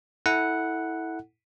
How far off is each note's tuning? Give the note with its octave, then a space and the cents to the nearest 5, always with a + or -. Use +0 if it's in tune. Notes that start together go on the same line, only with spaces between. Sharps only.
E4 -20 A4 +0 F#5 +0